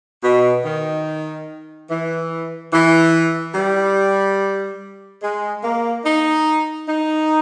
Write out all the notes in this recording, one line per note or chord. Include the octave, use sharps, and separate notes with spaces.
B2
D#3
E3
E3
G3
G#3
A#3
D#4
D#4